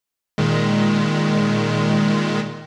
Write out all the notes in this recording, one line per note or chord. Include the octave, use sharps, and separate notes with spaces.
A#2 D#3 G#3